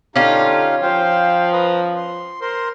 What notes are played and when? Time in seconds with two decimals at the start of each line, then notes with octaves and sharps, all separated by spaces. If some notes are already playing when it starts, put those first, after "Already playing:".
0.16 D3 C#4 D#4 F4 G4 F5
0.82 F3 C5 F5 G5
1.53 B4 A#5 D#6
1.96 C6
2.41 A#4 C5 C6